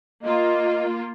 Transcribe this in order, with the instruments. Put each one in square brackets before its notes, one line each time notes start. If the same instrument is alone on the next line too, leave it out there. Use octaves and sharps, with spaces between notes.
[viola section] A#3 F4 [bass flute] D#5